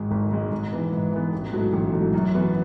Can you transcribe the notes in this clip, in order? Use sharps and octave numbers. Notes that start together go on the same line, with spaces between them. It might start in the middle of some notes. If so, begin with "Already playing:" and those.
Already playing: G#1 G#2 G#3
G#1
G#2 G#3
G#2
E3 B3
G#2
E3 B3
A1
G#2 F#3 A3
A1
G#2 F#3 A3
F#2
E3 B3 F#4